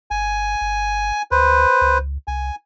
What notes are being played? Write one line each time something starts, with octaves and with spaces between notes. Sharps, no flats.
G1 G#5
G1
D2 B4 C5
C#2
C2 G#5